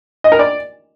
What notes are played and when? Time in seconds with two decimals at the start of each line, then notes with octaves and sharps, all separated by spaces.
0.24 D#5
0.32 A#4
0.39 D5